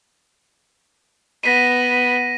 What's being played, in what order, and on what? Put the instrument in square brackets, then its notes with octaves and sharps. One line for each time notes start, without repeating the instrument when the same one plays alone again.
[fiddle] B3 [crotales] A#6 B6 D#7